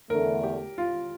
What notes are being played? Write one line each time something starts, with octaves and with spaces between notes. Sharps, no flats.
E2 D3 A3 A#4
G4
F4